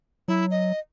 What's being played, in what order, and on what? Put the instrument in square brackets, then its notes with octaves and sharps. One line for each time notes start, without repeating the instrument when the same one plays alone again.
[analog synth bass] F#3 [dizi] E4
[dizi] D#5